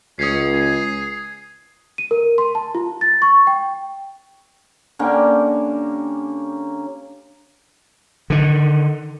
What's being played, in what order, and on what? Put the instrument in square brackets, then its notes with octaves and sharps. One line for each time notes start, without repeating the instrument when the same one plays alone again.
[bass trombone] C#2 [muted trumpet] C#4 [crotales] D#6 G#6 C7
[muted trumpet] G#4
[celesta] D#7
A#4
C6
A5
F4
A6
C#6
G5
[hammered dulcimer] D3 A#3 C#4 G4
[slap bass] D3 D#3